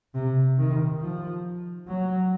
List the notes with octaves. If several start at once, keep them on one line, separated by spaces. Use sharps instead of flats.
C3
D#3
F3
F#3